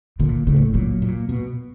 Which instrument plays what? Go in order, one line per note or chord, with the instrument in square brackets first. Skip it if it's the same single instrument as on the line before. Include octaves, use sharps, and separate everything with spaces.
[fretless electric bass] A#2 [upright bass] D3
[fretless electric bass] A2 [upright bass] C#3
[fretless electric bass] A#2 [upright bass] F#3
[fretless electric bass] A#2
B2